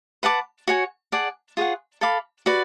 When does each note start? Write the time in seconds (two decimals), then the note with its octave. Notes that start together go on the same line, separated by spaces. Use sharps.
0.23 B4 F#5 A5 D6
0.68 F#4 C#5 G#5
1.12 G#4 D5 F#5 A5
1.57 F4 G#4 C#5 F#5
2.01 A4 F5 B5 D6
2.46 F#4 B4 D5